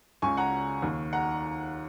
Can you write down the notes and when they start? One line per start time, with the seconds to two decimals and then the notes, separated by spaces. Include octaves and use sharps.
0.22 C#2 C#3 G#5 C#6
0.37 F#5 A#5
0.82 D#2 D#3
1.13 F#5 A#5